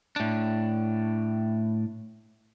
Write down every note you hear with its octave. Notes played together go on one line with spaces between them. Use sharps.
A2 D4